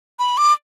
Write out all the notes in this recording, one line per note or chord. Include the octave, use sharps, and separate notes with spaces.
B5
D6